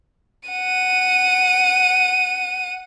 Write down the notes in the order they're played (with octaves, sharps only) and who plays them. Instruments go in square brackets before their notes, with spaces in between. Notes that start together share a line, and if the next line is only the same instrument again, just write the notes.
[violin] F#5 D#7